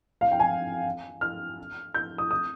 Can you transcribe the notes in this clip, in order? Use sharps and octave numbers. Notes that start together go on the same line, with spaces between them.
F5
G5
G#5
F6
G6
D#6
D#6